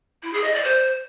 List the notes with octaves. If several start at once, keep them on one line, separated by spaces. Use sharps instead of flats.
E4
G#4
D#5
D5
C5